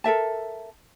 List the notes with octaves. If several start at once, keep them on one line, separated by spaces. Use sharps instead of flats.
A4 A#4 E5 A5